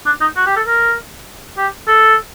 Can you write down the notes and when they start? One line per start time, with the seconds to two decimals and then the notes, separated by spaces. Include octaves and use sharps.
0.06 D4
0.21 D#4
0.36 F#4
0.46 G4
0.56 A4
0.67 A#4
1.58 G4
1.88 A4